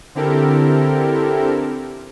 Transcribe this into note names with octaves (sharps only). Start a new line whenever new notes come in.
D3 C4 E4 G4 A4 A#4